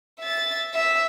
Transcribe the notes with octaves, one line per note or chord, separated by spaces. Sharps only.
E5 A6
E5